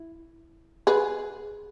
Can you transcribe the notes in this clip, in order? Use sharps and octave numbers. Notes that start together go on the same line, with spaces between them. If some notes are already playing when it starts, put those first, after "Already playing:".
Already playing: E4
G#4 B4